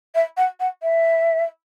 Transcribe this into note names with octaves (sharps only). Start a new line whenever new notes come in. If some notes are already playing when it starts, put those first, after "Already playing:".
E5
F#5
F#5
E5